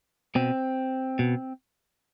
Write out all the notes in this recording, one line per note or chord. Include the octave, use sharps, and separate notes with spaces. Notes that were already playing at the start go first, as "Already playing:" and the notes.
B2 C4
B2